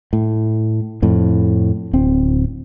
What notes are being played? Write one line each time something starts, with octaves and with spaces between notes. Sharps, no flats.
A2
F2 A2
D1 C4